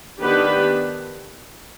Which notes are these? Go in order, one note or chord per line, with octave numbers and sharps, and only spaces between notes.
D#3 B3 D4 G4 B4